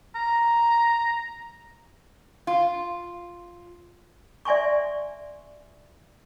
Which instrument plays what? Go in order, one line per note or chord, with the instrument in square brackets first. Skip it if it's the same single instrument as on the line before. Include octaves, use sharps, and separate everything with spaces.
[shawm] A#5
[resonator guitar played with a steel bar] F4
[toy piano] D5 E5 G#5 C6 C#6